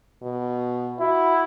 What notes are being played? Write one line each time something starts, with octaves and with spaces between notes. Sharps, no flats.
B2
E4 F#4